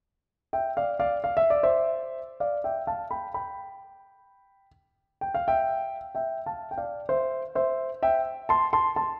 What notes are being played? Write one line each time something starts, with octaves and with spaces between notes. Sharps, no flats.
E5 G5
D5 F5
D5 F5
F5
E5
D5
C5 E5
D5 F5
E5 G5
F5 A5
G5 B5
G5 B5
G5
F5
E5 G5
E5 G5
F5 A5
G5
D5 F5
C5 E5
C5 E5
E5 G5
A5 C6
A5 C6
A5 C6